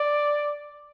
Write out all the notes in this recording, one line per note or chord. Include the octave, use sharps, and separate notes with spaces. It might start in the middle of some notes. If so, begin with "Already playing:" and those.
Already playing: D5